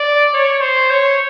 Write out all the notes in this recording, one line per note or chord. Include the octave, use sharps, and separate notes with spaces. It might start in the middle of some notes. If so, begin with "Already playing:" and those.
Already playing: D5
C#5
C5
C#5